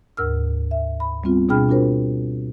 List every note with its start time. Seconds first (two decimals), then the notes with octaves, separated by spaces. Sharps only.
0.17 D2 G#2 A#4 E6 F6
0.71 E5
1.00 B5
1.24 G3 B3 C4 F4
1.49 B2 D4 G#4 G5 B5 F6
1.69 D4 F4 F#4 A#4 C5